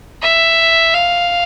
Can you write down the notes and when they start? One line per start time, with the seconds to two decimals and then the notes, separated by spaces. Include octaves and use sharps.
0.22 E5
0.94 F5